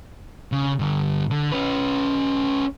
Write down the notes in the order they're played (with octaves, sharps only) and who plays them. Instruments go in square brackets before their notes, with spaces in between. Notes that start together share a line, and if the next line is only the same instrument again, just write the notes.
[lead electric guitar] C#3
G2 D3
D3
C#4 B4